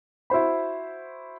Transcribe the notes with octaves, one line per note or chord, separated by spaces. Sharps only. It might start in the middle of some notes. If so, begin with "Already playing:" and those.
E4 F#4 C5 B5